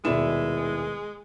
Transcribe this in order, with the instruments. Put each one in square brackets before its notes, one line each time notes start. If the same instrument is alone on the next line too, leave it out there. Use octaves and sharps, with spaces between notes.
[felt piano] D#1 B2 E7 [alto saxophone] G#3 [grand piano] E4 B4 D5